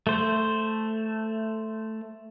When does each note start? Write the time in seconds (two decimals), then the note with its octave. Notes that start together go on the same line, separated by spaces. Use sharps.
0.07 A3 C5